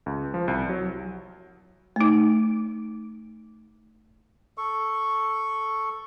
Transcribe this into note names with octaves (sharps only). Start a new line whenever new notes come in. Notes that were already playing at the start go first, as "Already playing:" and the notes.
C#2
F3
C2
F#3
A3 D#4
A4 C#6